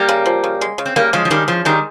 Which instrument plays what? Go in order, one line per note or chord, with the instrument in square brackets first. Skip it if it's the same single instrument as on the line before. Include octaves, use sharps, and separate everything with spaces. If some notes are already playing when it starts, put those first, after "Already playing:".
Already playing: [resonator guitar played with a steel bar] G3 A#3
[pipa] C#3
F3
C#3
G#3
C#3
[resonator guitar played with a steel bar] C4
[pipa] C#3 [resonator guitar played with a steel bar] G3 A#3
[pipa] C#3 [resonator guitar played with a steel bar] F3 G#3
[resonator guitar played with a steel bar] F3
[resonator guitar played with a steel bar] D#3 G3 [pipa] G#3
[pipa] C#3 [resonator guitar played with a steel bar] F3
[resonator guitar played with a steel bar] D#3 G3 [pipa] G#3